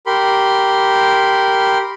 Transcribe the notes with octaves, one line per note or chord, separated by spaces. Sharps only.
G4 A#4 B5 C6